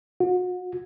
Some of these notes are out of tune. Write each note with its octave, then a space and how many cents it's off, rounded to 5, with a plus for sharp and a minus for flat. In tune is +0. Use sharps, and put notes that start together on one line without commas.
F#4 -35